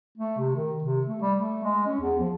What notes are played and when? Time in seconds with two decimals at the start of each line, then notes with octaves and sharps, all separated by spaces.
0.18 A3
0.38 C3
0.55 D#3
0.84 C3
1.07 A3
1.21 G3
1.37 A3
1.64 G#3
1.86 C#4
2.01 E2
2.19 F3